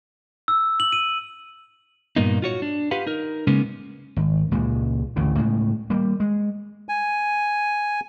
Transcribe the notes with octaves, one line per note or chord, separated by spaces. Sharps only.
E6
F#7
D#7
G2 A#2 A#3 B3 D#4
F4 F#4 C#5
D4
F4 G4 B4 F5 F#5
D#4 A#4
C#3 G#3 A#3 B3 C#4
G#1
C#2 A#2 C#3 G#3
A1 D2 A2 C#3
A2 C#3 G#3
G3 A#3
G#3
G#5